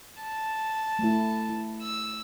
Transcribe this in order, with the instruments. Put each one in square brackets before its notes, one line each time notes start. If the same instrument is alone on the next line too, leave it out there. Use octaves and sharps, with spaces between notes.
[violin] A5
[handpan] A3 E4
E4
[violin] E6